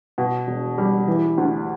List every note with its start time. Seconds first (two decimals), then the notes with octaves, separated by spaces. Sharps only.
0.18 B2
0.47 E1
0.78 G3
1.07 E3
1.37 D2